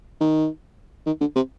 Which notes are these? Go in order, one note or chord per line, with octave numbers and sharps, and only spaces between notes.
D#3
D#3
D3
C3